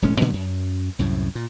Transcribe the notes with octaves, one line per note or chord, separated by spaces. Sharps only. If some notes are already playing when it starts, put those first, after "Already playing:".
E1 A2 G#3 C#4
A#2 D3 F#3 A3
F#2
C2 F#2 A2
A#2